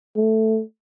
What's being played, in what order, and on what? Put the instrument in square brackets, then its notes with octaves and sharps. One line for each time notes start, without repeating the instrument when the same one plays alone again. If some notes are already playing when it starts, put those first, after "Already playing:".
[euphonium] A3